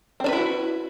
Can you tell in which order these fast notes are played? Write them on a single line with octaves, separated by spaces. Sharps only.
C4 D4 B4 E4 F#4